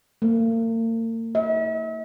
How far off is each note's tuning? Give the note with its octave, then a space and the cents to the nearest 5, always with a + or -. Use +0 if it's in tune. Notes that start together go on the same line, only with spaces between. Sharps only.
A#3 -45
E5 -40